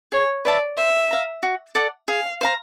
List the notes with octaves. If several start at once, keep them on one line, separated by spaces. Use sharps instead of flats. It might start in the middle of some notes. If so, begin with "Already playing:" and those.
G#4 C#5
B4 D5 E5 A5
C5 E5
F5 A#5
F#4
A4 D5 F#5
G#4 F5
C5 F5 A#5